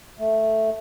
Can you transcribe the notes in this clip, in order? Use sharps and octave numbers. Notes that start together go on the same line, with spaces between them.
A3